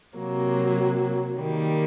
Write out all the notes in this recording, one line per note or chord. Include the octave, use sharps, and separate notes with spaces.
C3 F#3 A#3
D#3 G3 A#3